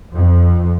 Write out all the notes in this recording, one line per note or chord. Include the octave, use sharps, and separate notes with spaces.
F2